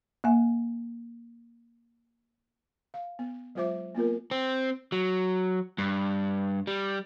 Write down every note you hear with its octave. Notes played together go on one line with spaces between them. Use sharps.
A#3 E5 G#5
F5
B3
F#3 G#3 F4 C5 E5 D6
A#3 B3 F4 A#4
C4
F#3
G2
G3